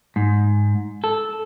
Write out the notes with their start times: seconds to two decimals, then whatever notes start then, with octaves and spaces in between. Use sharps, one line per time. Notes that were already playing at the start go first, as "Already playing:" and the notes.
0.16 G#2
1.04 A4